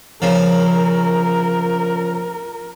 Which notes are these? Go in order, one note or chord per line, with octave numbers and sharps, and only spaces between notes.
C#3 F3 A#4